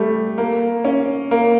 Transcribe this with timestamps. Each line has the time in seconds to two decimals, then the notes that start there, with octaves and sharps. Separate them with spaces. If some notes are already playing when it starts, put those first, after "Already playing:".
Already playing: G3 A3
0.38 A#3
0.85 C#4
1.31 A#3